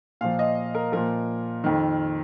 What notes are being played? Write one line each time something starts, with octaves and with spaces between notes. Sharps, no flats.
A#2 F3 F5
D#5
A#4
A#2 F3 A#4
F2 D#3